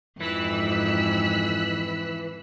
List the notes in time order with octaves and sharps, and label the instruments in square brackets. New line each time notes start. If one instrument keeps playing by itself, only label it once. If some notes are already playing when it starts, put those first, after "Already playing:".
[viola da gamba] F2 G#2 [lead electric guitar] E3 [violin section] E6 F#6 B6